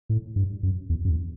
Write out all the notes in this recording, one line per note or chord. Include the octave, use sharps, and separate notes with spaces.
A2
G2
F#2
E2
F#2
E2